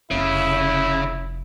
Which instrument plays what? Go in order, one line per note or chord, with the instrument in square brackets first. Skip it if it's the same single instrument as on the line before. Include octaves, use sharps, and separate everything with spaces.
[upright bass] F1 C4 [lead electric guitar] C#3 [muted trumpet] E4